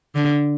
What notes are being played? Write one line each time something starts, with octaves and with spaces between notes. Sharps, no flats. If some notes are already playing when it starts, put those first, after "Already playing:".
D3